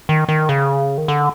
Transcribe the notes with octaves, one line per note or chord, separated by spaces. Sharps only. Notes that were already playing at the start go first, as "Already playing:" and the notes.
D#3
D#3
C#3
D#3
D3